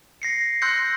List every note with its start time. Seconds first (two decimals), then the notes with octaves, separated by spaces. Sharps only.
0.22 A#6 C7 C#7
0.62 C6 E6 F#6 G6 A#6 C#7